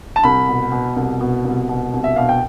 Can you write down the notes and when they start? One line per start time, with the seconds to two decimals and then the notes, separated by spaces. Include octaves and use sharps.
0.16 A5
0.24 C2 B5
0.49 B2
0.72 B2
0.96 C2
1.21 B2
1.45 C2
1.69 B2
1.93 C2
2.04 E5
2.16 B2 F5
2.29 G5